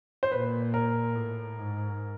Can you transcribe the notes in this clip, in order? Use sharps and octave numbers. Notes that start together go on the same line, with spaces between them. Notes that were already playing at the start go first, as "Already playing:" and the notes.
C5
A#2 B4
A#4
A2
G#2